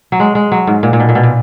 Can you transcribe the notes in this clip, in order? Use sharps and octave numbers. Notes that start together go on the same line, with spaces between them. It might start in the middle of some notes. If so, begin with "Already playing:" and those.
F#3
G#3
G#3
F#3
G#2
A#2
A#2
B2
A#2
B2
A#2